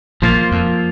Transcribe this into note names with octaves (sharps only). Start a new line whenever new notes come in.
A#1 A#2 F3 A#3 F4
F2